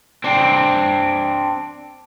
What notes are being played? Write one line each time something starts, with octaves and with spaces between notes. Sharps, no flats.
C4 D4